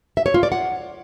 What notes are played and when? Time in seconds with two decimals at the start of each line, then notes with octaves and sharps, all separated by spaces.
0.17 E5
0.26 C#5
0.34 F4
0.43 D5
0.52 F#5